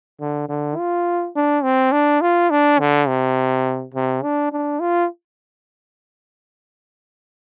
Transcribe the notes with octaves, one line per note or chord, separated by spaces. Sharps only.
D3
D3
F4
D4
C4
D4
F4
D4
D3
C3
C3
D4
D4
F4